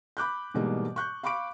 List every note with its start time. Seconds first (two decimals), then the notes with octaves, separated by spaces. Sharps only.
0.17 B5 D6 F#6 G6
0.54 G#2 B2 E3 G3 G#3 A#3
0.96 C#6 F#6 G6
1.23 F5 B5 C#6 D6 D7